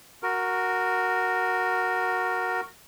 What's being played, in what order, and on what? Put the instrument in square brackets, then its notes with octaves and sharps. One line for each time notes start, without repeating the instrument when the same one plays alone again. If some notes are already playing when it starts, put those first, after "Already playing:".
[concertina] F#4 A#4